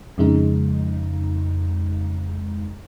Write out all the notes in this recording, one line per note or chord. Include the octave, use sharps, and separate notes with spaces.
F2 C#3 G#3 D#4